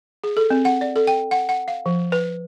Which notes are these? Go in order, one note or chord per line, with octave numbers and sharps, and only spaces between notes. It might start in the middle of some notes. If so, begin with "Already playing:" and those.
G#4
A4
C4
F#5
D5
A4
G5
F#5
F#5
F5
F3
B4